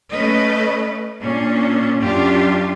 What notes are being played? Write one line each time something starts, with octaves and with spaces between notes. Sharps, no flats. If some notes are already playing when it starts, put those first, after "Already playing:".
A3 C#4 B4 D#5
A#2 C#4 D4
F#2 D4 F4 G4